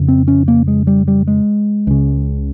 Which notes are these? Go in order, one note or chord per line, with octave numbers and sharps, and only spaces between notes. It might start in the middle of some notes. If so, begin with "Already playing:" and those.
Already playing: F2 C#3
C4
C#4
A#3
G#3
G3
G3
G#3
C#2 C#3